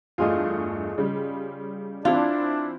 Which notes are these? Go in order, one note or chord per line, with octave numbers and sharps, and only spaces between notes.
E2 G2 A3 F4 G#4 D#5
C#3 G3
E3 C4 D4 E4 F4